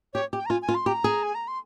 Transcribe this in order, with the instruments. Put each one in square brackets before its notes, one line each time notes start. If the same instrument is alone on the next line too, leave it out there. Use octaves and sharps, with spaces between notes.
[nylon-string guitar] G4 [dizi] C#5
[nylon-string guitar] G4
[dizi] G5
A#5
[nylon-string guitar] F4 [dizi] G#5
[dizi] G#5
[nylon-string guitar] F4
[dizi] C6
[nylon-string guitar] G4 [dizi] A#5
[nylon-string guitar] G#4
[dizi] G#5
A#5
C6